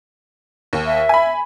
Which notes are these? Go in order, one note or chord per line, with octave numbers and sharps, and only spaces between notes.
D#2
E5
G#5 B5